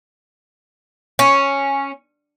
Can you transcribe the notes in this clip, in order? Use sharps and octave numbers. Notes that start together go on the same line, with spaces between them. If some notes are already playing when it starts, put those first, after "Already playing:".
C#4